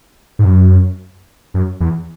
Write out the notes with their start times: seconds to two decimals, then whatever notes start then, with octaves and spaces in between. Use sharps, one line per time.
0.39 G#2
0.45 F#2
1.54 F#2
1.80 E2